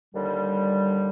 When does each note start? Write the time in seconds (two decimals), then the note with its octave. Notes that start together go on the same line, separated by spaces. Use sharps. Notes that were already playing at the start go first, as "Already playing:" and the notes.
0.14 D#2 D3 G3